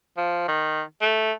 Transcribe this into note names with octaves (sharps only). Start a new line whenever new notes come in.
F3
D#3
A3